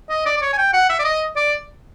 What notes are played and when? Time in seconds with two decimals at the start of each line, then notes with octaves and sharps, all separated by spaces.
0.10 D#5
0.26 D5
0.37 D5
0.41 C#5
0.53 G#5
0.58 G5
0.73 F#5
0.89 E5
0.99 D5
1.04 D#5
1.36 D5